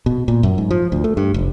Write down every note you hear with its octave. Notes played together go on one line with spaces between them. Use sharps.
B2
A#2
F#2
G#2
F3
D2
A3
G2
F1